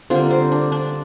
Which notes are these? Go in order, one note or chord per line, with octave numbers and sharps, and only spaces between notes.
D3 G3 A#3 C4 F4
C4
D4
D4